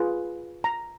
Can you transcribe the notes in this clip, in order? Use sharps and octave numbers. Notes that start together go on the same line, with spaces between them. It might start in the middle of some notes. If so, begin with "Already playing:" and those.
Already playing: F4 G#4 B4
A#5